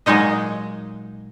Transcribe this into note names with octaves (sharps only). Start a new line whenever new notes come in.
A#2 F#3 G#3 D#4 D#5